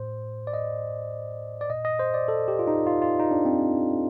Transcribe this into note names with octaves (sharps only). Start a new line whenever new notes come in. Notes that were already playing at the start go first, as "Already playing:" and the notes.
Already playing: A2 C5
D5
D#5
D5
A#2 D#5
D#5
C5
D5
A4
G4
F4
D#4
F4
F4
D#4
D4
C4